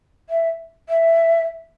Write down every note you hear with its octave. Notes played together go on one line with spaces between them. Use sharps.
E5
E5